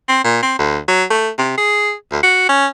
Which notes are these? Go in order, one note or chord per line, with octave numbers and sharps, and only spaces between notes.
C4
A#2
C4
D2
F#3
A3
C3
G#4
D2
F#4
C#4